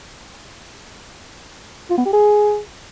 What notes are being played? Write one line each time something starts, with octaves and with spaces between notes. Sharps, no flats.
F4
B3
G4
G#4